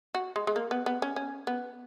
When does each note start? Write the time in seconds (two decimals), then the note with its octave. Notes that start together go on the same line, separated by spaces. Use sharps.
0.15 F#4
0.36 G#3
0.47 G#3
0.56 A#3
0.71 B3
0.86 B3
1.02 C#4
1.16 C#4
1.47 B3